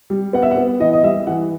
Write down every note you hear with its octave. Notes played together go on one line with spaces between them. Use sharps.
G3
B3 F#5
E5
F#5
B3
E3 D#5
D#5
G3 E5
E3 F#5